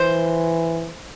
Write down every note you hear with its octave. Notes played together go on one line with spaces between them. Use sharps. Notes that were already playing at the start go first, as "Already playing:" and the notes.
Already playing: E3 C5